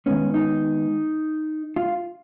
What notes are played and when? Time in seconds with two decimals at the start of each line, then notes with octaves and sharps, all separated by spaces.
0.06 D#3 G#3 B3 C#4
0.34 D#4
1.76 F4